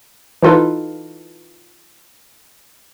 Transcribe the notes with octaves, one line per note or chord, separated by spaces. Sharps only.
E3 D#4 F4 A4 B4